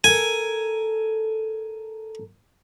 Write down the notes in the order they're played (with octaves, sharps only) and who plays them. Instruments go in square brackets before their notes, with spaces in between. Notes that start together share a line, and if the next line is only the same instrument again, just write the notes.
[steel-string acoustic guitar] A4 A#4 [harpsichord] G#5